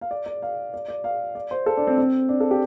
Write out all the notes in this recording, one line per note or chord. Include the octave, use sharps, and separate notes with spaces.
F5
D5
D5
F5
D5
D5
F5
D5
C5
A4
D4
C4
C4
D4
A4
G4